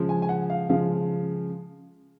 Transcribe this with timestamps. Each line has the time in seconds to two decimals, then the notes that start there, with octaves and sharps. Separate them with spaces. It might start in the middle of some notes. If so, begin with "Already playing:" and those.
Already playing: C#3 F3 G#3
0.09 G#5
0.22 G#5
0.29 F#5
0.50 F5
0.69 C#3 F3 G#3 F5